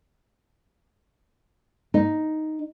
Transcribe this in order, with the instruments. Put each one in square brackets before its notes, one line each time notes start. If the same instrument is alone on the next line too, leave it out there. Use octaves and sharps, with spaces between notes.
[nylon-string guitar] D#4